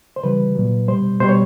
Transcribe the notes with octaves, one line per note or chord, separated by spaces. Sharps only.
C5
C#3 E3 G3 B4
A#2 F#3
B2 G3 C5
B2 G3 C5
C#5